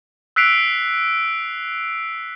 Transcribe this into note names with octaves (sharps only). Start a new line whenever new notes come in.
E6 F#6 B6 C7 D7 F7